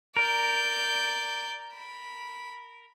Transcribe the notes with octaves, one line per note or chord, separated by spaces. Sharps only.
A#4 D5 G6
B5